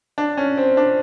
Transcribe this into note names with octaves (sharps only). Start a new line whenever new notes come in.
D4
C#4
C4
D4